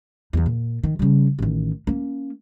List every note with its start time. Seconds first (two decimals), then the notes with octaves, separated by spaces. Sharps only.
0.33 E2 E3
0.46 A#2
0.83 D#3
0.99 C#3 G3
1.39 A1 D#3
1.87 A#3 C#4